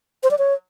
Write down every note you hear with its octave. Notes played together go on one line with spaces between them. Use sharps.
C5
D5
C#5